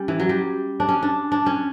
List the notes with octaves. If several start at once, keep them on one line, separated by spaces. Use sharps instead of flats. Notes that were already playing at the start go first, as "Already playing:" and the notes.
Already playing: G3 C#4
E3
F#3
G3
D4
C#4
D4
D4
C#4